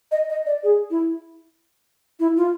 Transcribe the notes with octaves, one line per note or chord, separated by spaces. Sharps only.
D#5
D#5
D5
G#4
E4
E4
F4